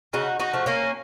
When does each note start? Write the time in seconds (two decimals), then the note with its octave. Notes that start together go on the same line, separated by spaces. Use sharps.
0.13 C#3 D#4 F#4
0.40 D#4 F#4
0.53 F3 A3
0.66 A#3 C#4